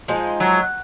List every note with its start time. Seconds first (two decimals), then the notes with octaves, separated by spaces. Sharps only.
0.08 F3 G#3 D#4 G#4
0.40 F#3